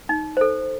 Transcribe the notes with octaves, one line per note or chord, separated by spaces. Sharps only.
D#4
A4 C5